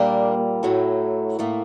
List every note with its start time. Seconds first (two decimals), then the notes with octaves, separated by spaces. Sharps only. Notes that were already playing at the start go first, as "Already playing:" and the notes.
Already playing: A#2 G3 A#3 D4
0.63 A2 F#3 A3
1.39 A2 A3 A#3